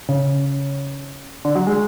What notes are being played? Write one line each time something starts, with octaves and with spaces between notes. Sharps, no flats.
C#3
D3
F#3
G#3